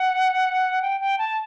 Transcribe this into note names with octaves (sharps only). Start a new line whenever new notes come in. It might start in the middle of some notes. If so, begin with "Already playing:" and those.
Already playing: F#5
G5
G5
A5